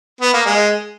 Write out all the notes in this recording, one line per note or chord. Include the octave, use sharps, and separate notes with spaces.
B3
A#3
G#3